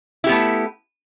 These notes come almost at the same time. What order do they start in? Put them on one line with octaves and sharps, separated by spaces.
E4 G4 B3 A3